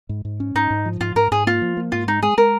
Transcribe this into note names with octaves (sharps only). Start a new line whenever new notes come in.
G#2
G#2
C#4
G#2 D#4
G#2
F3
G#2 F4
G#2 A#4
G#2 G#4
A#3 F4
F3
A#3
G#2 F4
G#3 D#4
G#3 G#4
G#3 A#4